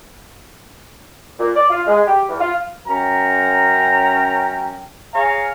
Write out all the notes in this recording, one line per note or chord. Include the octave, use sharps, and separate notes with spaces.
A#2
D5
F4
G#3
G4
E2
F4
F#2 C#4 A#4 G5 A#5
G#4 C#5 F5 G#5 A#5